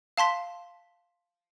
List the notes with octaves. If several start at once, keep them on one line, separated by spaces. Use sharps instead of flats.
F5 A5 C6 B6